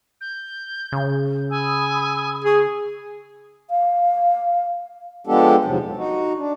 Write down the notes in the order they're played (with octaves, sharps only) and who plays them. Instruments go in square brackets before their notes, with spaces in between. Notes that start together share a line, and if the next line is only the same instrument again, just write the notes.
[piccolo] G6
[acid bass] C#3
[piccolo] G#5 [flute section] B5 D#6 E6
[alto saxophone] G#4 [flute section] C#6
[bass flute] F5
[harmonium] F3 G#3 B3 D4 G4 A4
E2 G#2 C3 F3 F#3
A#2
D#4 F#4
D4